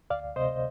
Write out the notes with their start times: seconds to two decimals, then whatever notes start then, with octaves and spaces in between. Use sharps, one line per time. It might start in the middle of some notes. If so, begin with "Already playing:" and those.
0.10 D2 D5 F5
0.36 C3 C5 D#5